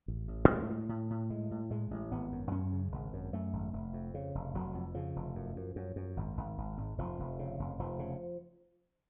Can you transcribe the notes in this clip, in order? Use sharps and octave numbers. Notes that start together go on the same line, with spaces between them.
A1
A1
A2 G#3
A2
A2
A2
A2 G#3
A2
A2 G#3
A1
G#1 B3
F#2
F#2 C#4
C#3
G#1
F#2
F#2 A3
G#1
F1
F2
C#3
F1
F1 F#3
F2
C#3 F3
F1
F#2
F#2
F#2
F#2
G#1
G#1
G#1
G#1
F1 F3
F1
C#3
F1
F1 F3
C#3